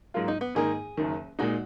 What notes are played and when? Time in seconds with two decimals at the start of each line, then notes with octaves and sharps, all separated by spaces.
0.14 G#2 F#3 A#3 F4
0.28 D#4
0.41 B3
0.55 G#2 D#3 A#3 D#4 G#4
0.98 F#1 F#2 D#3
1.39 A#2 G#3 D#4 F#4